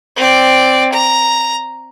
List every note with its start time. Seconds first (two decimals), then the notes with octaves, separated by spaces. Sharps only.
0.17 C4 D5
0.93 A#5